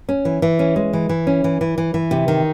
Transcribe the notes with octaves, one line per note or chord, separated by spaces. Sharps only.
C#4
E3
E3
C#4
G#3
E3
E3
C#4
E3
E3
E3
E3
C3
D#3